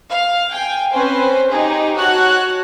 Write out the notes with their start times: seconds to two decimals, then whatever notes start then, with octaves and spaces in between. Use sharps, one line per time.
0.11 F5
0.53 G5 G#5
0.93 C4 C#4 B4 C5
1.51 D#4 G4 G#4
1.98 F#4 C#5 A5 F#6